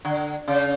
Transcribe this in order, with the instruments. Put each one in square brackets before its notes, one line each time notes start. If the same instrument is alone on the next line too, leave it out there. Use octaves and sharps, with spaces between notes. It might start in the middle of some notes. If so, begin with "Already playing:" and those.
[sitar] D3
C#3